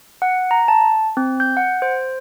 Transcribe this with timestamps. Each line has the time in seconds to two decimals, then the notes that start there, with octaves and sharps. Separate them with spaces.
0.22 F#5
0.51 A#5
0.68 A5
1.17 C4
1.40 G6
1.57 F#5
1.82 C5